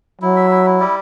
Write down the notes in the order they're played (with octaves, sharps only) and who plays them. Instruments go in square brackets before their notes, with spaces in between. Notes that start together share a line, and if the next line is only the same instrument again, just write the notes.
[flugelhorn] F#3 [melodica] E4
[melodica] E5
E4
E4
G3